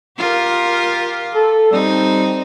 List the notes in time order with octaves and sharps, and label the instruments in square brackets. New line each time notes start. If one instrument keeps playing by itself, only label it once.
[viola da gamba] F4 G4 A#4
[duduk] A4
[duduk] G3 [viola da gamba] C4 D#4